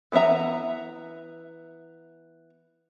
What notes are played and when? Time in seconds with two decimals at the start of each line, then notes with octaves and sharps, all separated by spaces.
0.12 E3 B3 D4 E5 A#5